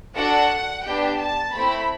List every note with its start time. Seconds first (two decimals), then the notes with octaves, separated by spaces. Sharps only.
0.15 D4 F#4 A4 F#5
0.85 B3 D4 G4 G5
1.19 A5
1.53 A3 C4 E4 B5